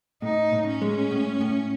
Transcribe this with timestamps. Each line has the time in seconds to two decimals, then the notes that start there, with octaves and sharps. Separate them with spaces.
0.22 A2 D#4
0.52 A2
0.67 C#4
0.82 G#3
1.11 A2
1.41 A2